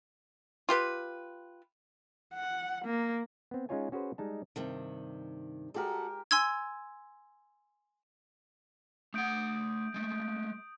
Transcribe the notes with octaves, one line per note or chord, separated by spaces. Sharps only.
F4 G4 B4
F#5
A#3
B3 C4
G#3 C#4 D#4 F4 C#5 G#5
C#4 F#4 G#4 B4 C5
G3 G#3 D#4 A5
G2 C3 D#3
G#3 F#4 G4 A4 A#4
G#5 C6 E6 G#6
A3 F#5 D#6 G6 D7
G#3 A3